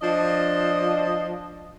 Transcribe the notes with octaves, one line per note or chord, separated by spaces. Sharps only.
F3 D4 D#5